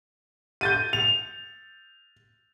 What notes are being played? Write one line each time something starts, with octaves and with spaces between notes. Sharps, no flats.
G6 A6 D#7
F7